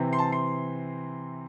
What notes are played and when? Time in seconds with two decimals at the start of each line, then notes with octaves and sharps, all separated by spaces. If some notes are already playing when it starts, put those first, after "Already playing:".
Already playing: C3 E3 C4
0.13 C6
0.19 A5
0.32 C6